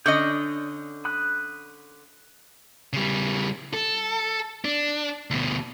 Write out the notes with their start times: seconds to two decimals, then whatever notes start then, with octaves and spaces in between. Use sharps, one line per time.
0.06 D3 C#4 D5 D#5 D#6 G6
1.05 B5 D#6 F#6
2.93 C#3 G3
3.74 A4
4.65 D4
5.30 D2 B2